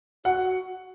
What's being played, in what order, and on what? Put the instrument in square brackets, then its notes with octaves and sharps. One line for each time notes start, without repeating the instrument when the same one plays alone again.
[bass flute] F#4 [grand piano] F#5